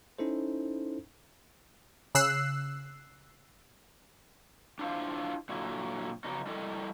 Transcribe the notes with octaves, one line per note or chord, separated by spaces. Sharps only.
C#4 D#4 E4 A4 C5
C#3 E6 F#6 C7
D4 E4 F4 C5 F5
A#2 D3 F#3 E4
C#3 F#3 B3 D#4
G3 E4 A4 A#4 D#5